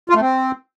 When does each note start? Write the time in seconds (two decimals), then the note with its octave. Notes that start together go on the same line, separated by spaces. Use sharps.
0.10 F4
0.15 A3
0.21 C4